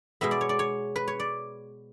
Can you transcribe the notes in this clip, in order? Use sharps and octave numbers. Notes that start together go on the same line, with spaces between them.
B2 G#3 B3 E5
D5
C#5
D5
C#5
B4
C#5
D5